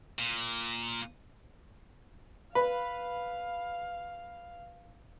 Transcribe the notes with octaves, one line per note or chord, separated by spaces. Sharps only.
A#2
B4 F5